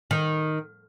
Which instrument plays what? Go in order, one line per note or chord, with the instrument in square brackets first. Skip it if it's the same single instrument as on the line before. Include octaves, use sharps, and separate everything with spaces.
[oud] D#3